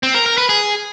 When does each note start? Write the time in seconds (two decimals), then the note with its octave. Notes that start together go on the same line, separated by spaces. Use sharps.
0.03 C4
0.15 A#4
0.26 A#4
0.38 B4
0.49 G#4